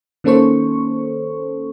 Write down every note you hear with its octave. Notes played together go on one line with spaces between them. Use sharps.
D#3 A#3 C#4 A4 C5 C#6